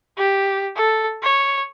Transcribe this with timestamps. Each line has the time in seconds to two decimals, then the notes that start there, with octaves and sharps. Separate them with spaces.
0.17 G4
0.76 A4
1.23 C#5